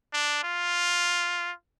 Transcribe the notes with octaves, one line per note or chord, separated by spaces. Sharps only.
D4
F4